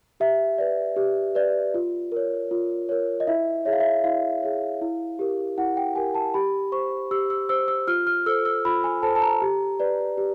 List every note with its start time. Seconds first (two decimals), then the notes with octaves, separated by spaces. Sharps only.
0.20 G4 E5
0.58 B4 D5
0.96 G4
1.35 B4 D5
1.74 F4
2.12 A#4 C#5
2.51 F4
2.89 A#4 C#5
3.20 D#5
3.27 E4 E5
3.65 G#4 C#5 E5
3.72 F5
3.80 E5
4.04 E4 F5
4.42 G#4 C#5
4.81 E4
5.19 G4 A#4
5.58 E4 F#5
5.77 G5
5.96 G4 A#4 G#5
6.15 A5
6.34 G4 B5
6.72 C5 C#6
7.11 G4 E6
7.30 E6
7.49 C5 E6
7.68 E6
7.88 F4 F6
8.07 F6
8.26 A4 C5 E6
8.45 E6
8.65 F4 B5
8.84 G#5
9.03 A4 C5 A5
9.16 A5
9.22 A#5
9.42 G4
9.80 B4 D5
10.18 G4